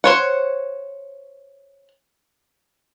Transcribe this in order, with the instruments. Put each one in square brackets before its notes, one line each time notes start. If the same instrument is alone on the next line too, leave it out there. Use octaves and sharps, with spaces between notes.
[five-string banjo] C5 C#5 F#5